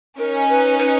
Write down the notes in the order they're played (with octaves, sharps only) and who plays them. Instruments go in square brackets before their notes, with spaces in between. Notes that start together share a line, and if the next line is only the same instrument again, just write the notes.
[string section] C#4 D#4 [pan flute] A#4
[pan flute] B4
B4